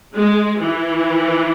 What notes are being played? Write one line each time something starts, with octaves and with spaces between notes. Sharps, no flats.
G#3
E3